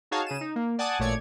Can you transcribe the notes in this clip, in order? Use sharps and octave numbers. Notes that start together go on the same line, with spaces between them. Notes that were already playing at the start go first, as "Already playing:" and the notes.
D#4 F#4 G#4 C#5 F5 A5
C#3 G#4 D#7 E7
D#4
A#3
D5 F#5 G#5 A5 D#6
A1 A#2 A3 C#5 D5 G#6